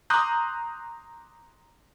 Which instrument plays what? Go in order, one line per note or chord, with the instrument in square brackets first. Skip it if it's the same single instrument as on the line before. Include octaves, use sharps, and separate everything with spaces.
[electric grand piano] A#5 C6 D6 D#6 F#6 G6